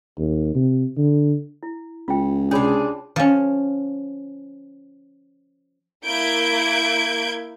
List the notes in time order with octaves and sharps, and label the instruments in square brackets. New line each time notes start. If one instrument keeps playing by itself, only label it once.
[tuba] D#2
C3
D3
[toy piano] E4
[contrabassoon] C#2 [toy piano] F4 G5
[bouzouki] C3 G#4 [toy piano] C#4 C#5 B5 [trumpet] D4
[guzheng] F3 C#4
[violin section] A#3 E4 G6 G#6 D7